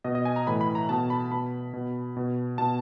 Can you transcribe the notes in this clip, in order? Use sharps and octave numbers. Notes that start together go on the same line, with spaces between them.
B2 D#5
D#5
G#5
A#5
A2 E3 B5
B5
A#5
B2 A5
B5
B2 B5
B2
B2
B2 A5